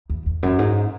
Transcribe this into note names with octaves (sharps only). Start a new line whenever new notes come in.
E2
E2
F#2
G#2